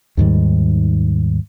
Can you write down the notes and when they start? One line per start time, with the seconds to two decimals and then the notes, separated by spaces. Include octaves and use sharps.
0.17 D#2 G#2 D#3 G3